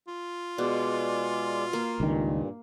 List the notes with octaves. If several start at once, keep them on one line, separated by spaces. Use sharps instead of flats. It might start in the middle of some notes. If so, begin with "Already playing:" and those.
F4
B2 G#3 D5
A#3
C#2 G2 A#2 D#3